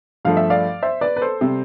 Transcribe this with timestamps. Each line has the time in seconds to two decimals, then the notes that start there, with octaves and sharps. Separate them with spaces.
0.25 G2 F3 A3 F5
0.37 E5
0.50 D5 F5
0.82 C5 E5
1.01 B4 D5
1.16 B4
1.21 A4 C5
1.41 C3 G3